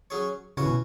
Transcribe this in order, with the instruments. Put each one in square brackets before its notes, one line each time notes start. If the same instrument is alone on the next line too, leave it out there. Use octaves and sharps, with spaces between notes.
[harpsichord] F#3 C#4 G#4 C#5
[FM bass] C#3 [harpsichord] E3 C#4 F#4 C#5
[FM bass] B2